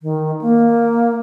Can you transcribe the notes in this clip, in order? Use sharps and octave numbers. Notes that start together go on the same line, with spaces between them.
D#3
A#3